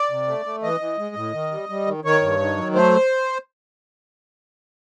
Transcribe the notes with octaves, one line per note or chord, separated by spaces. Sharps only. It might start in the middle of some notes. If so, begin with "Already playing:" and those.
Already playing: D5
C3
A3
A3
E3 D#5
E3
G#3
A2
D#3
G3
G3
D#3
D#3 C#5
G2
D#3
F#3
A3 C5